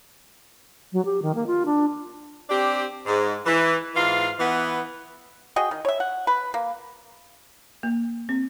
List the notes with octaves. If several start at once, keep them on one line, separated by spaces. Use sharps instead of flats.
F#3
G4
D#3
A#3
F4
D4
C4 D4 G4
G#2
E3
G#2 E3 F4 F5
E3 B3
F#4 G#4 D#5 G5
D#3
C#5 E5
F#5
B4
A#3
A#3
C4